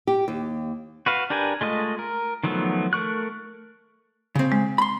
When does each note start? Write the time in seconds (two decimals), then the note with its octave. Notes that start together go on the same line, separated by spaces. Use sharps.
0.07 G4
0.28 D#2
1.06 F#4 B4 F5
1.30 D4 G4 A#4 B4 G#5
1.61 G#3 A3 F4 D#5
1.99 A#4
2.43 D#3 F3 F#3 A3 B3
2.93 A3 A#4 C#6 F#6
4.35 C#3 C4
4.52 G#3
4.78 B5 C6